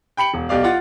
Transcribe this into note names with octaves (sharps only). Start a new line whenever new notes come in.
G5 B5 C#7 F#7
E1
B1 G4 D5 F5
F4 F#5 A6